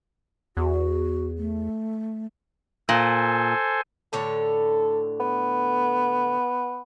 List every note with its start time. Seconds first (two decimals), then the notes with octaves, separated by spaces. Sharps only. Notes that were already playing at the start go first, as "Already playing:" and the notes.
0.57 E2 F#4
1.38 A3
2.89 A#2 A4 C5 G#5
4.13 A2 D3 A4 C#5
5.20 B3